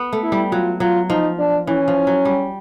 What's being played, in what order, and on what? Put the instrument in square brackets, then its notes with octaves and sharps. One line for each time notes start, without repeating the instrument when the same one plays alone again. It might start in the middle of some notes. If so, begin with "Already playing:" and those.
Already playing: [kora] B3
A3
[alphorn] E4
[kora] G3
[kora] F#3 [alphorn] F4
[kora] F#3 [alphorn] F4
[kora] F3 [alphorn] D#4
[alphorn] D4
[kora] E3 [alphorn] C#4
[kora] F3
F#3
G3